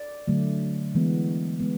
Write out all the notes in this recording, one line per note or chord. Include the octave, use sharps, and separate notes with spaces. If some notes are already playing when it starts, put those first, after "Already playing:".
Already playing: D5
D3 F#3 A3
E3 G#3 B3
G#3 B3